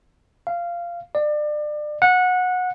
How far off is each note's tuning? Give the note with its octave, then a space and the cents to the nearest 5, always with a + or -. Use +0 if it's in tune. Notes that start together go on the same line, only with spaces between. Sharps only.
F5 -15
D5 +30
F#5 -20